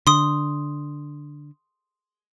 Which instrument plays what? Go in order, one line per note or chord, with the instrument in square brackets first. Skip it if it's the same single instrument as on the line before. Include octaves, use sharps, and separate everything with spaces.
[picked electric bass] D3 [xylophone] C6 D#6